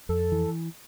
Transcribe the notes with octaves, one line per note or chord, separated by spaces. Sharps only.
F2 A4
E3